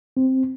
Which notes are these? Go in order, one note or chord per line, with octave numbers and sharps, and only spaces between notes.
C4